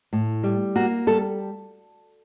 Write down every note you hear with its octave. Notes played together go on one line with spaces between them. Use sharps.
A2
G3
A#3 F#4
G3 A4